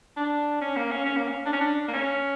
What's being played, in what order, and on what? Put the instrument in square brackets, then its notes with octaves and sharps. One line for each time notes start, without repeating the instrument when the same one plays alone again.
[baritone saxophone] D4
C#4
A#3
C#4
C#4
A#3
C#4
D4
C#4
D4
A#3
C#4